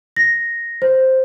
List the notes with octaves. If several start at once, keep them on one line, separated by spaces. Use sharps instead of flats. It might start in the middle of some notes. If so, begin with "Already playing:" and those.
A#6
C5